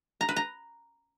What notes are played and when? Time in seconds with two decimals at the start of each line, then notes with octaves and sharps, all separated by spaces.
0.21 A#5
0.29 B4
0.36 A#5